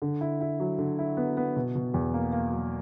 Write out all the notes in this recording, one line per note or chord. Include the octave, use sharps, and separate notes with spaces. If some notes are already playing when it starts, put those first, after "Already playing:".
D3
E4
E4
F#3
D3
E4
B3
B3
B2
B2
E2
A#3
A#3
F#3